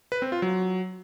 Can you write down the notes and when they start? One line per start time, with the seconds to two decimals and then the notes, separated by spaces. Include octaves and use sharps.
0.12 B4
0.22 C4
0.32 F4
0.42 F#3